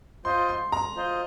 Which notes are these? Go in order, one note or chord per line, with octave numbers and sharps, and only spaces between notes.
F4 C5 D#5 C6
C6
A#5
F4 C5 D#5